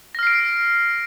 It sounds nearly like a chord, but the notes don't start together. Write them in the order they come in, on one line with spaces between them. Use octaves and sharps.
A#6 F6 C7 D7